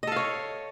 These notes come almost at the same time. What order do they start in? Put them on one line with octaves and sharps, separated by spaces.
D#5 A4 F5 C#5